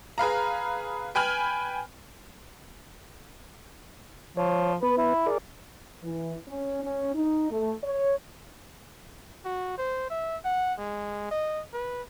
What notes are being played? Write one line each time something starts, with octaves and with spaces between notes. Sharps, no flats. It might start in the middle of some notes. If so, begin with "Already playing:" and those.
G#4 B4 F5 A#5
B4 G5 G#5 B5 F6
F3 C#5
B3 B4
E4
G#4 A#4 D5
E3
C#4
C#4
D#4
A3
C#5
F#4
C5
E5
F#5
G#3
D#5
B4